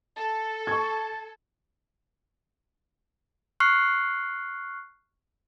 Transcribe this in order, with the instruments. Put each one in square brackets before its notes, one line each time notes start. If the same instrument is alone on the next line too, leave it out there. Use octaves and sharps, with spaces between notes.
[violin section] A4 [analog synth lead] A5
[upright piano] C#6 G#6
[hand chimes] C#6 F6 F#6 C7